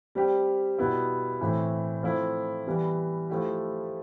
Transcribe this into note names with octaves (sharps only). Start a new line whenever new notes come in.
G3 C4 G4
B2 G3 B3 E4
A2 E3 A3 C4 E4
F3 A3 C4 E4
E3 G3 B3
F3 A3 E4 G4